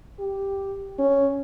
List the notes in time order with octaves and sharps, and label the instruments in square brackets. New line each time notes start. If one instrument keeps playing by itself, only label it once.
[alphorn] G4
C#4